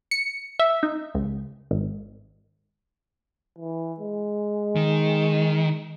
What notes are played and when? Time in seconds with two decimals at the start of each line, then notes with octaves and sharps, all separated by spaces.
0.11 C#7
0.59 E5
0.83 D#4
1.15 C#2
1.71 G#1
3.58 E3
4.00 G#3
4.76 D#3